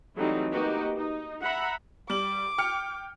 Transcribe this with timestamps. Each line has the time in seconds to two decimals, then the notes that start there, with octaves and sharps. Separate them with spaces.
0.16 E3 F#3 G3 A3 C4 D#4
0.51 A#3 D#4 F#4 G4 B4
0.97 D#4
1.42 E5 F#5 A#5 B5
2.10 G3 D6 F#7
2.58 G5 F6 C#7